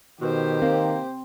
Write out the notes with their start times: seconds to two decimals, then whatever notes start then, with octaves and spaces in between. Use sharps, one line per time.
0.21 B2 D#3 G4 C5
0.62 A#3 C4